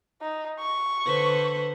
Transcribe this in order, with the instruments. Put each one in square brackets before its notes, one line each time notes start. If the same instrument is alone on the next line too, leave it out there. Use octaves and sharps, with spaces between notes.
[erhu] D#4
C#6
[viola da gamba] D3 B4 C5